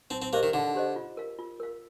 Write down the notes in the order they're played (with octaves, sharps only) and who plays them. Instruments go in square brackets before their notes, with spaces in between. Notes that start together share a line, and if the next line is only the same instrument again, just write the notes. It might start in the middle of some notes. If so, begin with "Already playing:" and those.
[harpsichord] C4 [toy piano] D#4
[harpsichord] C4
[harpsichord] A#3 [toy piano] G4 C5 D#5
[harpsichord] D#3
[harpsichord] D3 [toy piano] D#4
[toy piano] G4 C5 D#5
F4
A#4 F5
F4
A#4 F5